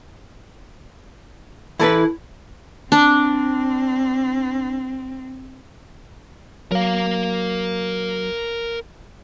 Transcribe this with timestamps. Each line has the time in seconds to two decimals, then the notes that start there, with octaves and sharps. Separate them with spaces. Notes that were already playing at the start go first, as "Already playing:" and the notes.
1.79 E3 E4 A4 B4
2.92 C4 D4
6.72 F#3 A#4 F5